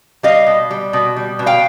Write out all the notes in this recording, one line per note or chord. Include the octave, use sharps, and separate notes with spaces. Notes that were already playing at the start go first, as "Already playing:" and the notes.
G3 D#5 F5
B2
G3
B2
G3
B2
F5 G5